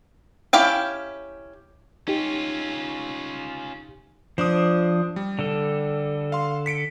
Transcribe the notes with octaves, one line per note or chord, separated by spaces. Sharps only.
C#4 E4 G4 F5 G5
C#4 D#4 F4 G4
F3 D4 C5 D#6
G3
D3 A4
F5 C6
B6 C#7 D7